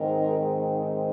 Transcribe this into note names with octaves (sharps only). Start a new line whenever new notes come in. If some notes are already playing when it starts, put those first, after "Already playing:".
Already playing: G#2 D#3 G#3 C4 A#4